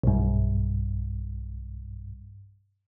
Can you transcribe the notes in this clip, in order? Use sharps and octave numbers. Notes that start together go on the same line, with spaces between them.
B1 G2